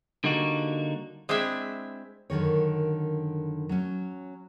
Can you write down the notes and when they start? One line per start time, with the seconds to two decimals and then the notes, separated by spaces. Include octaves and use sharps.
0.24 D3 G3 A#3 D#4 F#4
1.29 G#3 C4 D4 E4 E5
2.30 F#2 D3 D#3 C#5
3.69 F#3 C#4